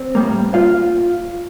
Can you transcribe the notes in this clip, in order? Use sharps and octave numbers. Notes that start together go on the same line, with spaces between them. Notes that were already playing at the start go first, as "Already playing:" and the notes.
Already playing: C4
A2 G3 A#3
F4 F5